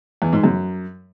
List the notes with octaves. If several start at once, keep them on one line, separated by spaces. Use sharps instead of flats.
E2
G#2
F#2